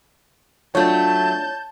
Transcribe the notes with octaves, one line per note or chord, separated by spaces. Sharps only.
F#3 A3 D4 F4 C#5 A5 G6